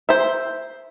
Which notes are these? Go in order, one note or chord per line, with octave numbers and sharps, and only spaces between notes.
C5 E5